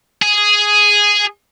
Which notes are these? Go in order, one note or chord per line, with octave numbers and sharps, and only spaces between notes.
G#4